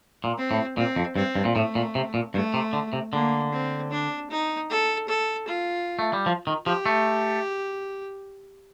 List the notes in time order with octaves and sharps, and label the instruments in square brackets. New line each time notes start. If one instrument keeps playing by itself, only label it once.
[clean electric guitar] A#2
[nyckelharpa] C4
[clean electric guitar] A2
[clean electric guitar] A#2 [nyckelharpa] C4
[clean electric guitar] F2
[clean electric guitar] G2 [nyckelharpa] C4
[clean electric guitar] G2
A#2
[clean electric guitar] A2 [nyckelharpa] A3
[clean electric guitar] A#2
C3
A#2
[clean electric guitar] G2 [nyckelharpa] A3
[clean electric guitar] C3
D3
C3
[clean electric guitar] D3 [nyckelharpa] A#3
[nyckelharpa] C4
D4
D#4
A4
A4
F4
[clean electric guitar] A3
G3
F3
D#3
[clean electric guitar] F3 [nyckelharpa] G4
[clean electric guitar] A3